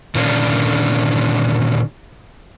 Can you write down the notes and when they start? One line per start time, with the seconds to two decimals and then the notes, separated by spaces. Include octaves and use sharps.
0.15 A#2 D3 D#3 C#4 D4 F5